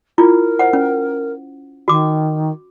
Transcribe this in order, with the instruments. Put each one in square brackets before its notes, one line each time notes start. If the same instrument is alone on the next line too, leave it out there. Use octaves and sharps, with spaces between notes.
[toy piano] E4 F4 [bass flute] A#4
[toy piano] C5 F#5
C#4
[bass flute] D#3 [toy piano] F#4 D6